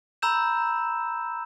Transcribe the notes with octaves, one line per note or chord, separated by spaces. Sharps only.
A#5 B5 E6 G6 E7